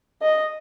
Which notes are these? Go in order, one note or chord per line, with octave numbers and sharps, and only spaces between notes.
D#5